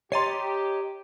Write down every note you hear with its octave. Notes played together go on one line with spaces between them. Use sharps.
G4 C#5 D#5 A#5 C6 A6 C7